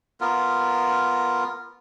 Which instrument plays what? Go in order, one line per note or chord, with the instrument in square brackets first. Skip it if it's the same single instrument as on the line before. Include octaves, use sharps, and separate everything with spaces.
[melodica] B3 F4 A#4